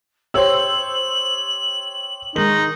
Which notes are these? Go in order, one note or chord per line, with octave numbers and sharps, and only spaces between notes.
G4 C5 C#5 E6 F#7
D#3 G#3 D#4 F#7